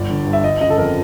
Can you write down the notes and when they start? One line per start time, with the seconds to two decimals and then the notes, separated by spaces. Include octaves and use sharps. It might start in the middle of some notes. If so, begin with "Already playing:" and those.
Already playing: G1 D5
0.10 D3
0.26 G2
0.33 E5
0.43 G1 D#5
0.61 C#3 D#5
0.70 A4
0.77 F2 A#4